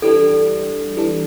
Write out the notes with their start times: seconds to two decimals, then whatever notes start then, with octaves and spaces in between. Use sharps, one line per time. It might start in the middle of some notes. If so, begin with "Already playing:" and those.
0.02 E3 G3 D4 A4
0.97 E3 G3 D4